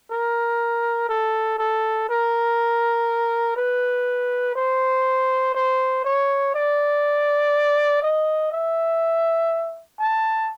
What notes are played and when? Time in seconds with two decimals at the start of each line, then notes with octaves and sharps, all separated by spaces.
0.11 A#4
1.09 A4
1.58 A4
2.09 A#4
3.56 B4
4.55 C5
5.54 C5
6.04 C#5
6.54 D5
8.02 D#5
8.51 E5
9.99 A5